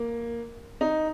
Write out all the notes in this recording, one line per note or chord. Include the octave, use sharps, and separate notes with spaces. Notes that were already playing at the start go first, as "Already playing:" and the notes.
Already playing: A#3
D#4